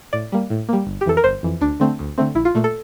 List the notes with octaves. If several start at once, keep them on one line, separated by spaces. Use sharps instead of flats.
A2 D5
G3 A#3
A2
G3 A#3
G1
G4
F2 E3 A4
A#4
G1 C5
F2 E3
D2 D4
D3 A3 C4
D2
D3 A3 C4
A#1 E4
F4
A#2 A3
A4